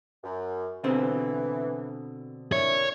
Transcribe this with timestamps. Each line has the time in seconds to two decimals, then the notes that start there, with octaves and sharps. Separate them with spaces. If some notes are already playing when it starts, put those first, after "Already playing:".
0.23 F#2
0.84 B2 D3 E3 C4
2.52 A#2 D4 E4 C#5